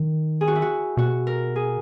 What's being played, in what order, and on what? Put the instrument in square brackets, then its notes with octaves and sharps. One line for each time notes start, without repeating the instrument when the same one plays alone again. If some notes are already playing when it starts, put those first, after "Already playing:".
Already playing: [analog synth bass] D#3
[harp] G#4
F#4
E4
F#4
[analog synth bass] B2 [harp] F#4
[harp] A#4
G#4